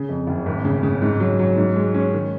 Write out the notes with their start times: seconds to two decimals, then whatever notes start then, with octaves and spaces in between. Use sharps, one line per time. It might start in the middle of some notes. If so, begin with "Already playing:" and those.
Already playing: C#3
0.09 F2
0.27 F#1
0.46 G#1
0.64 C#3
0.83 C#3
1.02 G#2
1.20 F#3
1.39 F#3
1.57 G#2
1.76 G#3
1.94 C#4
2.13 D#3